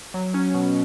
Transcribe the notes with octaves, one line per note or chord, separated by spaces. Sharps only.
F#3
C#4
B2